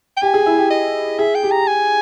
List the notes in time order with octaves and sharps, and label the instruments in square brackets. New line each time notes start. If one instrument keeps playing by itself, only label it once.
[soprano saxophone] G5
[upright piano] G4 [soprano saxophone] G#5
[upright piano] G#4
E4
G4
[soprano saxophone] D#5
[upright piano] G#4 [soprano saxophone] E5
[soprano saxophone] G5
[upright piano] G4
[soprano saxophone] A#5
G#5